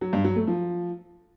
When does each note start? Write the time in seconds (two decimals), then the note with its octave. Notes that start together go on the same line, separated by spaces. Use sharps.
0.01 F#3
0.13 G2
0.24 F#3
0.36 A3
0.47 F3